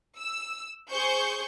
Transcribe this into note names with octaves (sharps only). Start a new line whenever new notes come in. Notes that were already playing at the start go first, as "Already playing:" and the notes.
E6
G#4 C5 C#6 G6